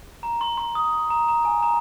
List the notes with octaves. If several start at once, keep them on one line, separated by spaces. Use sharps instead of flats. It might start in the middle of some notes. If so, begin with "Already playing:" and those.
A#5
C6
C6
D#6
C6
A#5
A#5
G#5
A#5